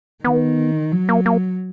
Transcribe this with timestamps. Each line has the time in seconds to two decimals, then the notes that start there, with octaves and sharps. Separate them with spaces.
0.24 D#3 B3
0.92 F#3
1.09 A#3
1.26 A#3